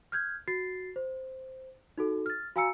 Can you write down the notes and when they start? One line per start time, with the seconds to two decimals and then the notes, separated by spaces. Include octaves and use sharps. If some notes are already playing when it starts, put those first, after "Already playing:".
0.12 F6 G6 G#6
0.48 F#4 A6 C7
0.96 C5
1.98 D#4 F#4 A4
2.26 F6 A6
2.56 F#4 F5 G#5 A#5 E6 C#7